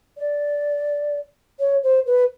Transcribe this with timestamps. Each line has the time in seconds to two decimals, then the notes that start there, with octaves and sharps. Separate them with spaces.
0.17 D5
1.59 C#5
1.83 C5
2.06 B4